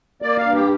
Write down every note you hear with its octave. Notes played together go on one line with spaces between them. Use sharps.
A#3 D5
G2 F5
G4